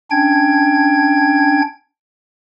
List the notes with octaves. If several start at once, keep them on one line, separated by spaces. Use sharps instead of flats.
C#4 D4 G5 G#6